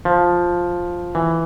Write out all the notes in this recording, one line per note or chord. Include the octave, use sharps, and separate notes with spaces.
F3
E3